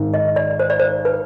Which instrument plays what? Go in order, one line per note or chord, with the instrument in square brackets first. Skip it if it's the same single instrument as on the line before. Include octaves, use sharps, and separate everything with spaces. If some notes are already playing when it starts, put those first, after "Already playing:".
Already playing: [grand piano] G#1 G#2 D#3
[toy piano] D#5
D5
C5
D5
C5
B4